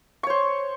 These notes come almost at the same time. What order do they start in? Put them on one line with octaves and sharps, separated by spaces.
C#6 C#5 C5